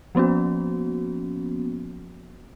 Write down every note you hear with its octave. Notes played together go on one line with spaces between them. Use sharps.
F3 A#3 B3 C#4 F#4